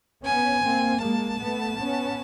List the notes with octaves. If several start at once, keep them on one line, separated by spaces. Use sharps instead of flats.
B3 C#4 G#5
A#3 C4
G#3 A#3 A5
A3 B3
B3 C#4